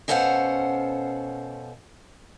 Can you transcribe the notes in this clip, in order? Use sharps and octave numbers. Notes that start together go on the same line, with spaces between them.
B2 C#4 A4 C5 F5 F#5